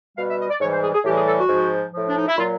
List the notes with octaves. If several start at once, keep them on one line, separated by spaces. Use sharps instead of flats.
B2 G3 F5
E5
D#5
D5
G#2 E3 G3 C#5
C5
G#4
G#4
A2 E3 G3 G4
G#4
A4
F#4
G#2 F3
A2 F3
D4
D#4
E4
A#2 F#3 F4